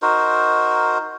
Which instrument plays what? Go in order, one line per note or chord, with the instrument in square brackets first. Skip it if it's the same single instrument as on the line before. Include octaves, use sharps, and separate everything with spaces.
[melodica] D#4 F#4 A#4 C5